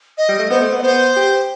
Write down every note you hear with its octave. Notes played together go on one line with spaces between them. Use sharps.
D#5
G3
A3
B3 C5
A3
B3
D#5
B3 C5
G4